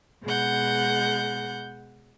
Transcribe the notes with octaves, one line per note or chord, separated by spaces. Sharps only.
B2 G#3 F#5 G6